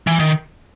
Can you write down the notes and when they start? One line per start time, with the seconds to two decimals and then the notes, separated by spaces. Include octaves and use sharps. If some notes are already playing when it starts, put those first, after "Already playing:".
0.07 E3
0.20 D#3